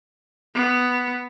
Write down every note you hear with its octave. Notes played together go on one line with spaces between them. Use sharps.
B3